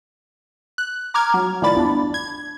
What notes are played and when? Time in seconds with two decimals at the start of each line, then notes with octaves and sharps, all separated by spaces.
0.78 F#6
1.14 A#5 D6 F6 G#6
1.34 F#3
1.62 A2 D#3 F3 D5 B5 A6
1.75 G1 E2 D4
2.14 G#6